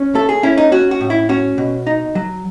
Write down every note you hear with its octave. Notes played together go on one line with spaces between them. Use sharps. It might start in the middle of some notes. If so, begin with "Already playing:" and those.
Already playing: C#4
A3 A4
G#4
C#4 E4
D#4
C#4 F#4
F#4
A2
E4
C#4 F#4
B2
D#4
F#3